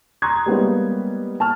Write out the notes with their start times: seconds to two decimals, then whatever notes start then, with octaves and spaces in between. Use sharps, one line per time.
0.22 A#5 C6 C#6 D#6 F#6 G#6
0.46 G3 G#3 A#3 B3 C#4 D#4
1.40 A5 C#6 F6